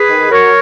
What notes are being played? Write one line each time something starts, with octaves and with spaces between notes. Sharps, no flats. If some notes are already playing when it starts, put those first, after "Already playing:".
Already playing: G#4 B4
D#3
F#3 A#4 C#5